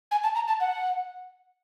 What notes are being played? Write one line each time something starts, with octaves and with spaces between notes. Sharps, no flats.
G#5
A5
A#5
A5
F#5